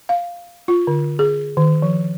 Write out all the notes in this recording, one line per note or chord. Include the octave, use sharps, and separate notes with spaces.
F5
F4
D3
G#4
D#3
F3